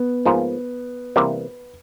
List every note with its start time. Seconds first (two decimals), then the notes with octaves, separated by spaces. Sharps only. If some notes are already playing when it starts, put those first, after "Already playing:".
Already playing: B3
0.25 G#2 F3 A#3
1.16 C3 E3 G3 A#3